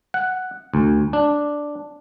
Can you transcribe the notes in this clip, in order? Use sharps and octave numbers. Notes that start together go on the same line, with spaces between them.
F#5
D2
D4